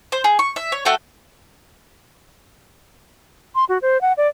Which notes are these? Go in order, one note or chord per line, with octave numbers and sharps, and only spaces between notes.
C5
G#4
C#6
E5
C#5
A3 F#4 A4 G5
C6
F#4
C5
F#5
D5